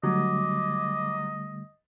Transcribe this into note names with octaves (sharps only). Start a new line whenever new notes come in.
D3 F#3 G3 A3 D#5 D6